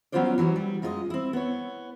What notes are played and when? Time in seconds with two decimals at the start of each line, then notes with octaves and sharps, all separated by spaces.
0.12 F#3 B3 C#4 F4 C5 D5
0.38 E3 F#3 G3 B3
0.56 G3
0.82 F#2 G#3 F4 A#4 D#5
1.10 C4 E4
1.33 B3 C#5